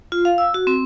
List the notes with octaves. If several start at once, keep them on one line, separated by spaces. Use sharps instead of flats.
F4
F5
E6
F#4
C4